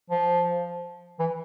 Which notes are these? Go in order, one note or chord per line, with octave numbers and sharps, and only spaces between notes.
F3
E3